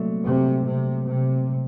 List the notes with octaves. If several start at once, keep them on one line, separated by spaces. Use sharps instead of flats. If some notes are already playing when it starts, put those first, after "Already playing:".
Already playing: C2 A#2 F#3 A3
C3
C3
C3